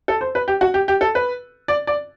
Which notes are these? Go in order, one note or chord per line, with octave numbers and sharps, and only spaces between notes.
A4
C5
B4
G4
F#4
G4
G4
A4
B4
D5
D5